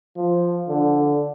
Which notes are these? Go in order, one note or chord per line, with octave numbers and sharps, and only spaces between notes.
F3
D3